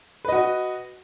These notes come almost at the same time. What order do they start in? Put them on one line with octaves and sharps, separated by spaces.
B4 D#5 F#4